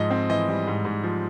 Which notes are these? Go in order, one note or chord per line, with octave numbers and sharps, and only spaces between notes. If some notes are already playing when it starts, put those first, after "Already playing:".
Already playing: G#2 F3 D#5
C4
E3 D#5
G3
G#2
G#2
F3